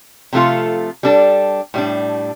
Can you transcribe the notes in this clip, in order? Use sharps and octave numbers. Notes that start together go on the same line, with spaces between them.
C3 F3 A3 F4 A4
G3 D4 A4
A2 G3 D4